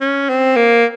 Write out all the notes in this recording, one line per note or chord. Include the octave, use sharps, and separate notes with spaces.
C#4
C4
A#3